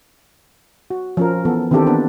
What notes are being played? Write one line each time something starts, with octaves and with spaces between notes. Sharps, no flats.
F#4
F3 C#4 A#4
E3 B3 A4
D#3 E3 C4 D4 G4 A4
A#3 B3 D4 B4